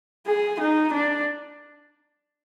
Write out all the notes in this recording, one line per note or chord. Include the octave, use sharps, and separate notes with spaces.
G#4
D#4
D4